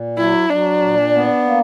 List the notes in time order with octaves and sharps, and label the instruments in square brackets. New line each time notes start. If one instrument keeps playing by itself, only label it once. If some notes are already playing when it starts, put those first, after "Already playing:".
Already playing: [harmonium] A#2
[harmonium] F#3 [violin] E4
[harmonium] F#3 [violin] D4
[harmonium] A#2
B3
A#3